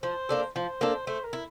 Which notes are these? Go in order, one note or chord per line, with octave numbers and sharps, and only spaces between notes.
F3 C5
A#3 D4 A4
F3 C5
A#3 D4 A4
A3 C5
A#4
E4